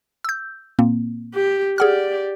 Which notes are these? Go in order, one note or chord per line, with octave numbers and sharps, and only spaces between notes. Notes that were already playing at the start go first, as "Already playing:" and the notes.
E6 G6
A#2 A#3 C4
G4
G4 G#4 D5 F#5 F6